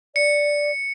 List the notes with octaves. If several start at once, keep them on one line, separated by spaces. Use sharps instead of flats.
D5 C#7